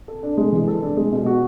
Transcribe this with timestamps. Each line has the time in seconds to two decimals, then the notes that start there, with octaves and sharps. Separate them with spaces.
0.08 A4
0.23 D4
0.37 G#3
0.53 E3
0.67 A4
0.82 D4
0.97 G#3
1.12 B2
1.26 F#4